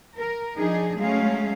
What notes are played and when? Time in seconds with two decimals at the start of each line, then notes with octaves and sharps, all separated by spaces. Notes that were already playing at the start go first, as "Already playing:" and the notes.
0.15 A#4
0.58 F3 D4 D#4 G#4
0.97 F#3 G#3 A3 C#4 G#4 F5